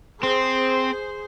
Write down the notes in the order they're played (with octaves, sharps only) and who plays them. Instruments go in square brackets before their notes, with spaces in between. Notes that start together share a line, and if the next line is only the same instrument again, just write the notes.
[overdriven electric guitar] C4 [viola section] G#4 C5